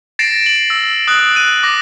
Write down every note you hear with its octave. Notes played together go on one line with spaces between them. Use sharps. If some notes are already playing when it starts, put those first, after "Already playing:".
A6 A#6 C7 D7 E7
F#7
E6
D#6 F#6 F#7
F#6 D#7
D6 A#6